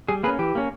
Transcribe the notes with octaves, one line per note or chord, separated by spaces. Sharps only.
G3 G#4
A#3 C#4 G#4 B4
E3 G4
A#3 C#4